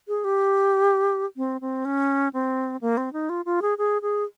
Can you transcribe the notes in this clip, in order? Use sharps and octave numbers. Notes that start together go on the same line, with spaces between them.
G#4
G4
C4
C4
C#4
C4
A#3
C4
D#4
F4
F4
G#4
G#4
G#4